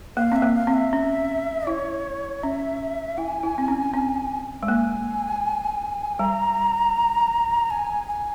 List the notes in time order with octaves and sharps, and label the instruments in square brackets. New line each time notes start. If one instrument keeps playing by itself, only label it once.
[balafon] A#3 [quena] F5
[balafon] C4 [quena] E5
[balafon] A#3
[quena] F5
[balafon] C4
[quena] E5
[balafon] C#4
[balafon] E4 [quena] C#5
[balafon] C#4 [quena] E5
[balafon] E4 [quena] G#5
[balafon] E4
C4
C#4
C4
G#3
[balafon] A#3 [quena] G#5
[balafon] G3 [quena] A#5
[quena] G#5
G#5